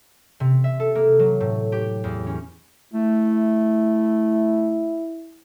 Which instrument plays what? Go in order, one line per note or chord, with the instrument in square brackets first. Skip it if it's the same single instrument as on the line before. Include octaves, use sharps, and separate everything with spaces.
[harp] C3
E5
A4
A#3
F#3
A2
G4
E2
C#4
[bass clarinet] A3 [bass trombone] E4